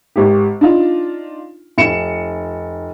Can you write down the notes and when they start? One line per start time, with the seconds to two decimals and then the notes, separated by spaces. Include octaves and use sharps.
0.16 G#1 G4
0.61 D4 D#4 F4
1.78 F1 C#7 E7